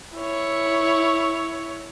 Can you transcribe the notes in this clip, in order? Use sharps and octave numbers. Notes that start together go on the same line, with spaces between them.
E4 C#5